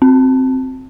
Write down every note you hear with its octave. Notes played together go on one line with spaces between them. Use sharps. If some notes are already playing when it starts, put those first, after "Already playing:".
C4